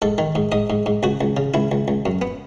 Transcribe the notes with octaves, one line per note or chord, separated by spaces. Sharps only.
G#2 A4
D#3
G#2
G#2 D#5
G#2
G#2
C#2 F#4
C#2
C#3
C#2 E4
C#2
C#2
F#2
B3